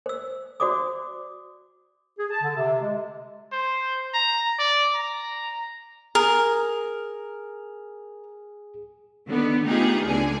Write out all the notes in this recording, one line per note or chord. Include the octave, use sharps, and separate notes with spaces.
C5 E6
F#4 C5 D5 D6 D#6
G#4
A5
D3
C3
G#3
C5
A#5
D5
A#5
G#4 A#4
D3 D#3 B3
A3 B3 D#4 F4 G4 G#4
C#2 D3 G#3 G#4 G#5